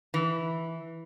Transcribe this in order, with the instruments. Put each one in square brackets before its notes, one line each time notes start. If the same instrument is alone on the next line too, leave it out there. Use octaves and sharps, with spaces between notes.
[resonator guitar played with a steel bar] E3